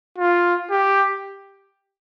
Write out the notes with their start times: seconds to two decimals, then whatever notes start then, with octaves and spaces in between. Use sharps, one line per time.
0.18 F4
0.71 G4